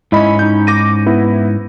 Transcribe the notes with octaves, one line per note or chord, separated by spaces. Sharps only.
G#2 C#4 E4 D#5 B5
D#4 G6
D6 A#6 D#7
B3 E4